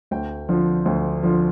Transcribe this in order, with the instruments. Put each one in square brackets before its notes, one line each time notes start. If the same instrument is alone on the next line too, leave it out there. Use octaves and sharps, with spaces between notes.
[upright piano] D2 G5
D3 F3
D2
D3 F3